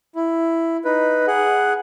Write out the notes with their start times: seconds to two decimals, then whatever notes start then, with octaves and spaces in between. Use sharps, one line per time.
0.15 E4
0.85 D#4 B4
1.27 G#4 F#5